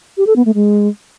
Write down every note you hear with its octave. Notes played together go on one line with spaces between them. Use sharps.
G4
A4
B3
A3
G#3